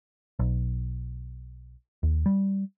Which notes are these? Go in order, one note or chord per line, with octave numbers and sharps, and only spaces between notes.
B1
D#2
G3